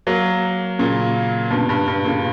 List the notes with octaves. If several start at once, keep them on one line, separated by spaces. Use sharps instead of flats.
F#3 A#3
A#2 C#3
G2 B2
G2
G2
A#2 C#3